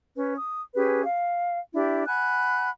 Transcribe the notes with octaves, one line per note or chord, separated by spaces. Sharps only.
C#4 B4
D#6
C#4 G4 G#4 B4
F5
D4 E4 G4
F#5 G#5 B5 F#6